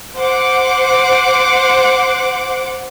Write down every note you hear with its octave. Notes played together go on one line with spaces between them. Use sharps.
C5 F#5 D6